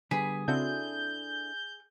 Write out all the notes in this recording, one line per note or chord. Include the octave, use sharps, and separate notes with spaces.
D3 G3 B3 G#4 B6
C#3 C4 D4 E4 F#4 A4 G6